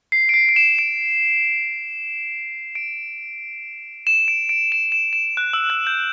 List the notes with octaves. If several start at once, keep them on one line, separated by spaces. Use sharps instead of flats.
C7
D7
C7
D7
E7
D7
D7
E7
D7
D7
E7
E7
E7
F#6
E6
F#6
G6